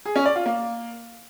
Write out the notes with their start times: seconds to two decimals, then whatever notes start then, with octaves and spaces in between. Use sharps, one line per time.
0.06 G#4
0.16 C#4
0.26 D5
0.36 F4
0.46 A#3